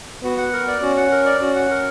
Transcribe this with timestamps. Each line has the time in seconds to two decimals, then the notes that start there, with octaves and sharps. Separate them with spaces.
0.23 B3 F#4
0.38 F#5
0.53 A#4
0.68 D5
0.82 C#4 F#4
0.97 F#5
1.12 A#4
1.26 D5
1.41 C#4 F#4
1.55 F#5
1.71 A#4